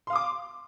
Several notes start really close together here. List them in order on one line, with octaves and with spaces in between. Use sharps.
C6 F5 D#6 D6